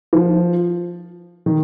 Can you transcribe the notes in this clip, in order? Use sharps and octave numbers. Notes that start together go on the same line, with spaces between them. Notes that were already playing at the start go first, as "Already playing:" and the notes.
F3
D#3